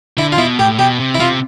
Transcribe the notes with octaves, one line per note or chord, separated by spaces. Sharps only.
D3 E4
F4
B2 E4
A2 G4
B2 G4
C3
E4
C3 F4